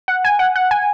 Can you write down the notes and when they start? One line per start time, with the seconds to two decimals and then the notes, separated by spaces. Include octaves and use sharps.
0.08 F#5
0.24 G#5
0.39 F#5
0.56 F#5
0.71 G#5